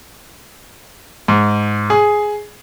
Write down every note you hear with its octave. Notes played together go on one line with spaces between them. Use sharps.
G#2
G#4